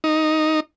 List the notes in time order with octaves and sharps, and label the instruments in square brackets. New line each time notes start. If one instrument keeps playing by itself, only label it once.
[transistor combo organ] D#4